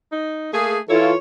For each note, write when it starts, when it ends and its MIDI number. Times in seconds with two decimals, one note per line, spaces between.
0.12 0.50 63
0.53 0.80 57
0.53 0.76 58
0.53 0.76 68
0.89 1.14 52
0.89 1.12 64
0.89 1.14 65
0.89 1.14 69
0.89 1.18 73